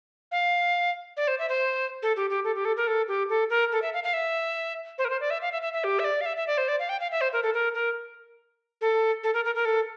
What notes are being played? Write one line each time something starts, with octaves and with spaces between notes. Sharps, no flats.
F5
D5
C5
E5
C5
A4
G4
G4
A4
G4
A4
A#4
A4
G4
A4
A#4
A4
E5
F5
F5
E5
C5
A#4
C5
D5
E5
F5
E5
E5
E5
G4
E5
D5
F5
E5
E5
D5
C5
D5
F5
G5
F5
E5
C5
A#4
A4
A#4
A#4
A4
A4
A#4
A#4
A#4
A4